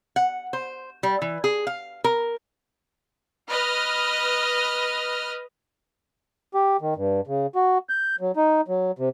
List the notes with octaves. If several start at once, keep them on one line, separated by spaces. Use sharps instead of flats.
F#5
C5
G3
E3
G#4
F5
A#4
B4 D#5 F6
G4
D#3
G2
C#3
F#4
G6
F#3
D#4
F#3
C3